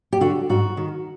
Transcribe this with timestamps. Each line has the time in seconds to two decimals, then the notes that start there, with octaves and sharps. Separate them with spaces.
0.13 G4
0.21 D3 F#4
0.49 G#2 F#4
0.77 D#3